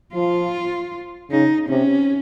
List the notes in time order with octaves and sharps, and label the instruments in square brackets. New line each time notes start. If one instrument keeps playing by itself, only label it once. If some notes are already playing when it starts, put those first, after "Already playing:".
[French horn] F3 [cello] F4
[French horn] C#3 [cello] D#4
[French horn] C3 [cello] C#4